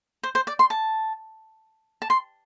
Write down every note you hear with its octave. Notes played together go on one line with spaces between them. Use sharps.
C5
C5
D5
C6
A5
A5
C6